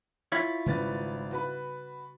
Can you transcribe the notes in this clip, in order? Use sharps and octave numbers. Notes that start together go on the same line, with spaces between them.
E4 F4 C#5
G#1 C#3 G3 C#4 B4 A6
F#4 B4 B5